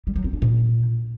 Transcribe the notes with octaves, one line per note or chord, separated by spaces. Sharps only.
G3
F#3
C4
D4
A#2